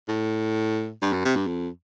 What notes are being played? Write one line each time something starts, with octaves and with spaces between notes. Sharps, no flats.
A2
G2
F#2
C3
G2
F2